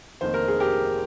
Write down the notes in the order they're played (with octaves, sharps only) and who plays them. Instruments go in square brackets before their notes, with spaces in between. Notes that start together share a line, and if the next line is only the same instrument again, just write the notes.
[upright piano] F1 F2 D#3 A#3 C5
A#4
G#4
G4 A#4